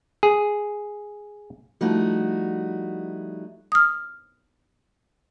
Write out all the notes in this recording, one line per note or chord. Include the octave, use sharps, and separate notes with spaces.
G#4
F3 G3 A3 D#4 E4 F#4
D#6 F6